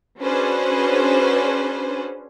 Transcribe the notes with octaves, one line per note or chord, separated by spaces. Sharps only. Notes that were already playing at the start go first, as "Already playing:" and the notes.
C#4 D4 F#4 G#4 B4 C5